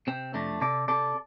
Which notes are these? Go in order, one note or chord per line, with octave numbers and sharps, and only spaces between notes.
C3 C4
F2 A3 D4
C3 A4 D5
C3 A4 D5